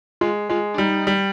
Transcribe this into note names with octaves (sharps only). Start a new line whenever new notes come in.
G#3 F4
G#3 F4
D4
G3 D#4
G3